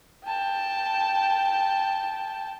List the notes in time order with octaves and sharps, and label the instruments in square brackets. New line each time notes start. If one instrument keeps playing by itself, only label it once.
[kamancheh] G5 A5